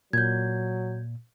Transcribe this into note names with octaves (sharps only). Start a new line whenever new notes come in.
A#2 F#3 G6 G#6